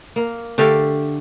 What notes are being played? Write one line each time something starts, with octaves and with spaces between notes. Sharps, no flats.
A#3
D3 A3 G4 F5